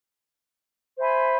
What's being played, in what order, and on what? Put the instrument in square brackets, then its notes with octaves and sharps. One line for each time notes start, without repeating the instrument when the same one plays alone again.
[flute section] C5 E5 G#5 B5